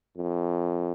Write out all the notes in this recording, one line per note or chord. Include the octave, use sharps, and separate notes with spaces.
F2